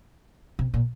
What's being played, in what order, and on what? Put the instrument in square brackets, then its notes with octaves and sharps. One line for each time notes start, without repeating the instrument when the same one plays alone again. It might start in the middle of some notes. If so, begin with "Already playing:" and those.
[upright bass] C3
A#2